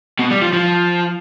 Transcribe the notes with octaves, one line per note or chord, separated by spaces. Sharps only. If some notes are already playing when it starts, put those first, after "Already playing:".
B2
G3
F3
F3